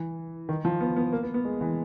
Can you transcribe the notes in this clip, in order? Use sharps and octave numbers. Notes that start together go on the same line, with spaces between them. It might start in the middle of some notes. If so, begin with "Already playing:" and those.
Already playing: E3
D#3
F3
B3
B3
A#3
B3
B3
G#3
E3